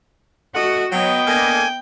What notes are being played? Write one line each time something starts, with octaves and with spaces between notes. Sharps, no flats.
A3 F#4 D#5 F#5
F#3 B3 D#5 G5
A#3 D4 A4 G#5